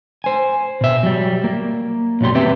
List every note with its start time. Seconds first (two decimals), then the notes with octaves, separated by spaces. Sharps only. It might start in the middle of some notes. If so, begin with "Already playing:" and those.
0.24 C5 G#5
0.81 B2 E5
1.03 F#3 G3
1.44 A#3
2.21 B1 F#2 F#3 G3 C6
2.35 C4 G4 B4 E5